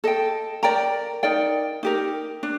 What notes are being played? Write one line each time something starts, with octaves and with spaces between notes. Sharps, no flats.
A4 D#5 G5
A#4 D5 G5 A#5
D#4 A#4 D5 G5
D#4 G4 A#4
D4